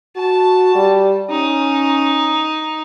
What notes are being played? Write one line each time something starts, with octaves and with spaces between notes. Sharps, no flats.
F#4 A5
G3
C#4 D#4